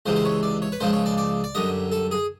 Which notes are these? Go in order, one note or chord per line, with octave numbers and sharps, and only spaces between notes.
C#2 C3 E3 G#3 C5
C5
C#5
D5
C#5
B4
C#2 C#3 F3 G#3 C5
C#5
D5
D5
D5
F#2 D3 G3 D#5
A4
G#4